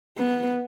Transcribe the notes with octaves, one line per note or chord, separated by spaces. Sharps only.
B3